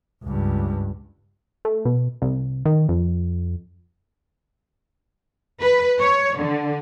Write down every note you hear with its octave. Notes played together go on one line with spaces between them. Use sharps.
C#2 G2
A3
B2
C2
D#3
F2
B4
C#5
D3